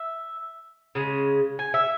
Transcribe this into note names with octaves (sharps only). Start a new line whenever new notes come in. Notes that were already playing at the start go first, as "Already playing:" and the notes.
Already playing: E5
C#3 G#3
G#5
E5